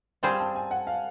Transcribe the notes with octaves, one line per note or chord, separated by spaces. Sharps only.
G3 C4 F4 G#4 C5 G#5
A5
G#5
F#5
F5